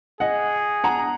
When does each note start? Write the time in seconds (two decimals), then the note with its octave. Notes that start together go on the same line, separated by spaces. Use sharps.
0.20 G#4 D#5 F#5
0.84 F#5 A#5